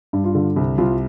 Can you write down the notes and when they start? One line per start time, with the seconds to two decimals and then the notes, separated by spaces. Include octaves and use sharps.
0.13 G2
0.24 F4
0.35 D3
0.56 C2
0.78 C2 F4